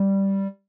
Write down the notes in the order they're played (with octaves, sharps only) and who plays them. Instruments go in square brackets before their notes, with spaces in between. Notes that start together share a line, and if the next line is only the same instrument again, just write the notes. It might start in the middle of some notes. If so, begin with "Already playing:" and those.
Already playing: [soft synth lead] G3